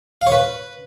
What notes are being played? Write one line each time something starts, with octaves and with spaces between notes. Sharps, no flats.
F5
C#5
B4